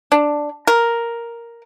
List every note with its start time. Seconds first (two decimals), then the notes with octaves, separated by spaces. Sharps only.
0.12 D4
0.67 A#4